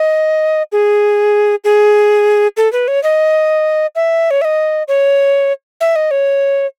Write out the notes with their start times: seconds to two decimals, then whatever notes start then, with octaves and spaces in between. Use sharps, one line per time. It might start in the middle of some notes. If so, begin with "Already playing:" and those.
Already playing: D#5
0.72 G#4
1.64 G#4
2.57 A4
2.73 B4
2.88 C#5
3.03 D#5
3.95 E5
4.31 C#5
4.41 E5
4.45 D#5
4.88 C#5
5.81 E5
5.96 D#5
6.11 C#5